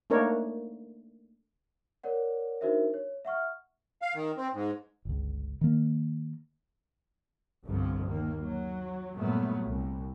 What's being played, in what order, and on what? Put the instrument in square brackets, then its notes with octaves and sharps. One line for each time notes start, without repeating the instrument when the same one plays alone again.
[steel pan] A3 A#3 D4 D#4 A#4 C#5
[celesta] A#4 C#5 D5 F#5
D4 D#4 F#4 A#4 C5 E5
C#5
E5 F#5 C#6 F6
[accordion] F5
D#3
C4
G#2
[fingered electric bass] G1 C#2
D#3 A#3
[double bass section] G1 C2 G2 F3
D#2 A#3
F#3
G2 A#2 F#3 A3 B3
C2